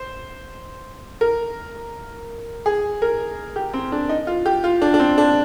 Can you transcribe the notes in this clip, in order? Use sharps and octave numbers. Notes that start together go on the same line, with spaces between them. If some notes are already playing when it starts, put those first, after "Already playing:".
Already playing: C5
A#4
G#4
A#4
G4
C4
D4
D#4
F4
G4
F4
D4
D4
C4
D4